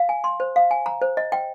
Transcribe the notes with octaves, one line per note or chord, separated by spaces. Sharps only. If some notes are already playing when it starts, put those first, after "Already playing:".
Already playing: F5
G#5
C6
C5
F5
G#5
A#5
C5
D#5
G5